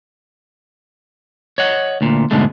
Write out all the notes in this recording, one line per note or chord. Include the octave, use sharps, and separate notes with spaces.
C#5 D#5 F#5
D2 A#2
D2 G#2 B2 G#3 A3